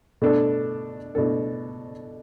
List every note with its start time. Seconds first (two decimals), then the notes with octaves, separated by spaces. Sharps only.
0.22 B2 A3 D4 A4
1.15 B2 A3 D4 A4